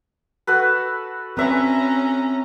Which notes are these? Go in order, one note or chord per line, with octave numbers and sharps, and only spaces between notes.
F#4 A4 B4
C4 C#4 B4 D5 E5 A#5 C#6